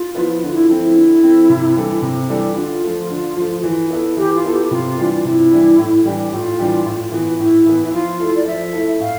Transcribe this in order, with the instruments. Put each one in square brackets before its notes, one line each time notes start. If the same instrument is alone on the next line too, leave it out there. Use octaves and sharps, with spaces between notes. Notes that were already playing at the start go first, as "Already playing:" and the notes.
Already playing: [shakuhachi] F4
[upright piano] F3 B3 E4 B4
[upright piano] D3 [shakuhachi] F4
[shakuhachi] E4
[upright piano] F3 A3 C4
[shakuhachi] E4
[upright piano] D3
F3 A3 C4
C3
E3 G3 D4 A4
C3
E3 G3 D4 A4
[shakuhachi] E4
[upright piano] D3 [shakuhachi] F4
[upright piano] F3 A3
D3
F3 A3
E3
B3 E4 A4
[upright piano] E3 [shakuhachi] G4
[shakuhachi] F4
[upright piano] B3 E4 A4
[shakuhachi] G4
G4
[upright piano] C3 [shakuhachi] F4
[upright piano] E3 G3 D4
[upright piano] C3 [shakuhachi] E4
[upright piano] E3 G3 D4
A2
E3 G3 D4 G4
[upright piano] A2 [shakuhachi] F4
[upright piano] E3 G3 D4 G4
A2
E3 B3
[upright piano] A2 [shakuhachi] E4
[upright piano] E3 B3
[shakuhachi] E4
[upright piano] F3 [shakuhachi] F4
[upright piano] A3 E4 A4
[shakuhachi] D5
[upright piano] F3 [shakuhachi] E5
[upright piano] A3 E4 A4
[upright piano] A2 [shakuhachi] F5